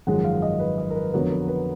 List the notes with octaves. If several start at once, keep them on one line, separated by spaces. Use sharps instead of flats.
G#1 F#2 F3 G#3 F#5
F5
D#5
B4
D#5
A#4
B4
F2 D3 F#3 B3 A#4
B4
B4